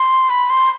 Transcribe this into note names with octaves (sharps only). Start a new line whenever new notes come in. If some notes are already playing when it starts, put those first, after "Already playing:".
Already playing: C6
B5
C6